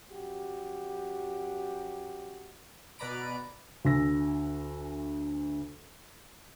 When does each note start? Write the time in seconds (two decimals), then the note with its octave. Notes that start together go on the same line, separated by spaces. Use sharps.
0.11 F#2 F#4 G4
2.99 B2 B4 D5 A#5 B5 D7
3.85 D2 G#5 E6 A#6